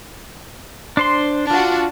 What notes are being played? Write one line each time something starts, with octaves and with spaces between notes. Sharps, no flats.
D4 C5 C6
D4 F4 F#4